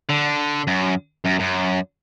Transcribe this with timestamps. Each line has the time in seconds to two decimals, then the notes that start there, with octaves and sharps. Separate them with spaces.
0.10 D3
0.67 F#2
1.24 F#2
1.39 F#2